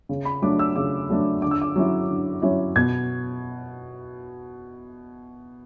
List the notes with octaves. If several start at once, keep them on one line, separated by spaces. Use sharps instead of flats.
C#3
B5
F#3 A3 D4 D6
E6
C#3 D6
F#3 A3 D4
D3 D6
E6
D6
F#3 C#4 E4
D3
F#3 C#4 E4
B2 G#6